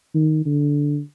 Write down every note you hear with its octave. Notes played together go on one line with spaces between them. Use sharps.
D#3
D3